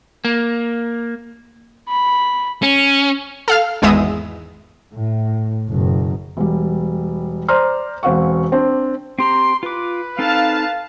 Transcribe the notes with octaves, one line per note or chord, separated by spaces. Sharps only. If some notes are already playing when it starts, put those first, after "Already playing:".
A#3
B5
C#4
A4 F5 F6
G#1 E2 G#3 B3 E5 D#6
A2
F#1 B2
E1 G3
C5 D5 A#5 C6 F6
E1 C4 F5 F#5 C#6
C4 D4
C4 G4 A#5 C6
F4 B4 D6
C4 D#4 A4 F5 A5